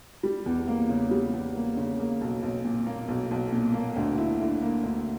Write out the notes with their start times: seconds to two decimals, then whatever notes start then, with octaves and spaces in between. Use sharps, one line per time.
0.23 G3
0.46 E2
0.68 A#3
0.89 C#3
1.11 G3
1.33 E2
1.55 A#3
1.77 C#3
2.00 A#3
2.21 B1
2.43 B1
2.65 A#2
2.86 A#3
3.08 B1
3.31 B1
3.52 A#2
3.74 A#3
3.96 D2
4.18 E4
4.40 D3
4.62 A#3
4.83 D2